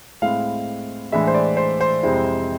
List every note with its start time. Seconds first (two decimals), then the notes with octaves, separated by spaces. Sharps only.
0.22 A2 G#3 C4 E4 F5
1.12 A2 E3 G#3 D4 E5
1.27 C5
1.34 D5
1.57 C5
1.81 C5
2.03 F2 C3 G#3 C4 E4